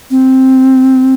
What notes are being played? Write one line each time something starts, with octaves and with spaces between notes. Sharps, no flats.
C4